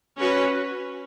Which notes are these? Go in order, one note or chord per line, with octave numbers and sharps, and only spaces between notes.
C#4 F#4 B4